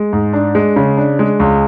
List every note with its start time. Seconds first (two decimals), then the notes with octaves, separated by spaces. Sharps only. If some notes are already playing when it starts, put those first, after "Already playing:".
Already playing: G#3
0.13 G#2
0.33 D4
0.55 G#3
0.76 C#3
0.97 D4
1.19 G#3
1.40 C#2